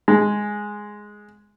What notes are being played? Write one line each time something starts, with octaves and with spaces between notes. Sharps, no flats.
G#3